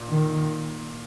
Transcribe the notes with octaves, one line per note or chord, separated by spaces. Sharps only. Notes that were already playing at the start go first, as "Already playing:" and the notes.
Already playing: A#2
D#3